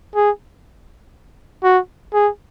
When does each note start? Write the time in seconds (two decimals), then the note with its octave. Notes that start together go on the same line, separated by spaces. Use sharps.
0.15 G#4
1.63 F#4
2.13 G#4